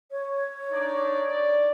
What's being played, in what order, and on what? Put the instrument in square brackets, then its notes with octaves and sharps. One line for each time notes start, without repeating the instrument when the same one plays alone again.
[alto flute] C#5
[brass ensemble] D4 D#4 D5
D5